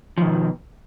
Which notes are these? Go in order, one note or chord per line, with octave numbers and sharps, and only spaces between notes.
B2 D#3 F3